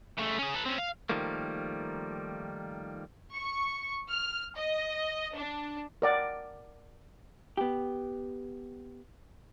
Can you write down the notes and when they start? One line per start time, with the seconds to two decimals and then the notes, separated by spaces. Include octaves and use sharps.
0.18 C#3 A3
0.38 C#4 G#4
0.54 A4 B4
0.66 C4 C#4
0.78 F5
1.09 D#3 F3 G3 A3 A#3
3.34 C#6
4.10 F6
4.56 D#5
5.36 D4
6.02 A#4 D5 F#5
7.57 B3 G4